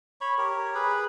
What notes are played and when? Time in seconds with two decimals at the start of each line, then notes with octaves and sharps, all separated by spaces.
0.21 C#5 B5 C#6
0.38 G4 A#4 C#5
0.75 G#4 B4 B5